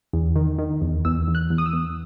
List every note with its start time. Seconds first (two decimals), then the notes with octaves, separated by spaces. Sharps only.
0.13 E2
0.36 D#3
0.58 D#3
0.82 E2
1.05 E2 E6
1.28 E2
1.35 F#6
1.50 E2
1.58 D#6
1.66 E6
1.73 E2